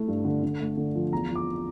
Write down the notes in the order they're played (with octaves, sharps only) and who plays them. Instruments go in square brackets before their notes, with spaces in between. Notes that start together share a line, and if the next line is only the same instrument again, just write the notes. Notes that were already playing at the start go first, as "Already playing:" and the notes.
Already playing: [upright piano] A3 E4
G2
D3
D3
A3
D3
F3
E2 A#5
F3
D6